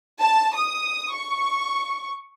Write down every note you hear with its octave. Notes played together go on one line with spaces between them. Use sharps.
A5
D#6
C#6